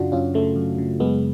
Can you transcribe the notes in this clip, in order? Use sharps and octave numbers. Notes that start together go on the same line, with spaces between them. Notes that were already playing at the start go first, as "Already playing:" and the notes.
Already playing: F#2 C#3 D4 F4 F#4
F#2 C#4 F4
C#3 A3
F#2
C#3
F#2 G#3 B3